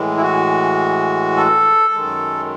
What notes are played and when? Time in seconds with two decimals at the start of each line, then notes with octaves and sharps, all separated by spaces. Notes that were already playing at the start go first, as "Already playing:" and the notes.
Already playing: A2 E3 G#3
0.17 E4
0.22 F#4
1.36 A4
1.94 F#2 D#3 G#3